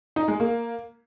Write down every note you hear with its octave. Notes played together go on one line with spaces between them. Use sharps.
D#4
G#3
A#3